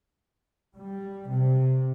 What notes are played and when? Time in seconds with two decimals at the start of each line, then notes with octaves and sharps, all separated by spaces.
0.75 G3
1.30 C3